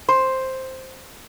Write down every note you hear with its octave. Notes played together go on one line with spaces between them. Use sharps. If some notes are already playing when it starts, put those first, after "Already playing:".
C5